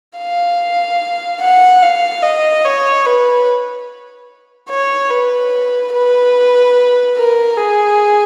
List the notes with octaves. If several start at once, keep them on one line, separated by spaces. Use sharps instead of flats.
F5
F#5
F5
D#5
C#5
B4
C#5
B4
B4
A#4
G#4